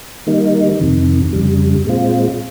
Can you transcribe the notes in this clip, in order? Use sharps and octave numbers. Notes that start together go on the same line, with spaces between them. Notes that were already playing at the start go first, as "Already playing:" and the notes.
D#3 G3 A#3 D#4
F2 C3 D#3
F2 C#3 G3
A#2 G#3 C4 F4